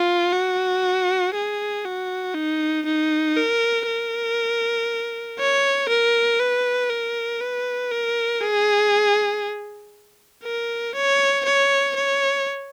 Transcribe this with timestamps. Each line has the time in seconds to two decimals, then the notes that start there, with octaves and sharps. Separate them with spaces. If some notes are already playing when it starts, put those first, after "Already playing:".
Already playing: F4
0.33 F#4
1.35 G#4
1.85 F#4
2.35 D#4
2.86 D#4
3.37 A#4
3.87 A#4
5.39 C#5
5.89 A#4
6.40 B4
6.90 A#4
7.40 B4
7.92 A#4
8.41 G#4
10.44 A#4
10.95 C#5
11.45 C#5
11.96 C#5